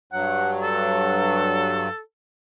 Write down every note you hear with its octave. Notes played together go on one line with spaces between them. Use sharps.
G2 F#3 F#5
A4